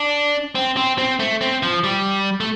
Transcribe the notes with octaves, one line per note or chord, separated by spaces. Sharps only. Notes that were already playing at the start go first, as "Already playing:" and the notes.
Already playing: D4
C4
C4
C4
A3
C4
F3
G3
A3